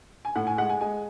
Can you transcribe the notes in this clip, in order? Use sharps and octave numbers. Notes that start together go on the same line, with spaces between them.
G#5
A2 F#5
G#5
G#3 F#5
G#5
G#3 G#5